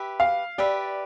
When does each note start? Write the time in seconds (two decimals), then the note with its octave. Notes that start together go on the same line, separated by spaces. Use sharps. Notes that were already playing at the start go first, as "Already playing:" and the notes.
Already playing: G4 B4 E5
0.20 F5
0.58 G4 B4 D5 E5